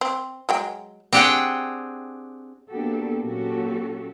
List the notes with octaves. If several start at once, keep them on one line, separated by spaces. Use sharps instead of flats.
C4
F#3 G#3 G5
C4 D4 G4 G#4 F#5 G5
A#3 B3 D4 F#4 G4 A4
A#2 F#3 C#4 F#4 G4 A4